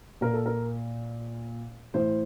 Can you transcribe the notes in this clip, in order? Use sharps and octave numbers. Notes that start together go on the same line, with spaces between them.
A#2 A#4
A4
A#4
A2 E3 C5